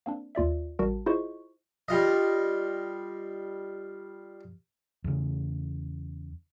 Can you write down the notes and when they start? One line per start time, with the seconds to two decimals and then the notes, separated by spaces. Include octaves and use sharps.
0.06 A#3 C4 D4
0.35 D#2 F4 D5 E5
0.79 A1 G3 F#4 A#4 A5
1.06 E4 F4 G#4 C5 D#5 C#6
1.88 G3 F4 D#5
5.04 E2 C#3